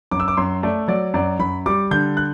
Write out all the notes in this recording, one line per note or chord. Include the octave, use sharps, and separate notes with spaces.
F#2 D6
E6
D6
F#2 C6
A3 D5
F#3 D5
F#2 D5
F#2 B5
G3 D6
D3 G6
F#6